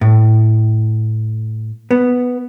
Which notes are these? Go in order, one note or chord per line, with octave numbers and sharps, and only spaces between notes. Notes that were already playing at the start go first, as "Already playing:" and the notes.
A2
B3